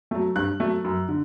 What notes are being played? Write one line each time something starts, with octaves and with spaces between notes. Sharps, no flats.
F#3 A3
G2 F#6
F#3 A3
F#2
D3